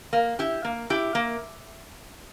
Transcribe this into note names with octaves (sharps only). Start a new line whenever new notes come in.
A#3
E4 G4
A#3
E4 G4
A#3